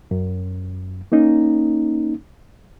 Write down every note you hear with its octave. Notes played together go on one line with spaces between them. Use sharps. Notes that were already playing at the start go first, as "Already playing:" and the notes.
F#2
A#3 C#4 D#4